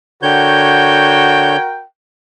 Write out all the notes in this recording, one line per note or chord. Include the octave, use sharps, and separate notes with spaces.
D3 F#4 A#4 C#5 G5 G6